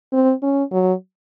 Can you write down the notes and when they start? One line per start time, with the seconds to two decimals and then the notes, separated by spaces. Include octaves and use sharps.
0.12 C4
0.43 C#4
0.72 F#3